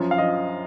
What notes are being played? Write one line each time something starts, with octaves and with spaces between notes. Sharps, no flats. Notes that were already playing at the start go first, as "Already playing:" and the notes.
Already playing: F#2 F3
F5
F3 D#5